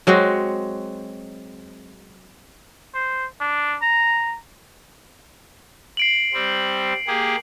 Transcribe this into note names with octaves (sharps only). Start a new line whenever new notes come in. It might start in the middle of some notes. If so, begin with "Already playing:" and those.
F#3 G#3 C4 F#4
C5
D4
A#5
C7 D7 F#7
G3 C4
A#3 G4 G#4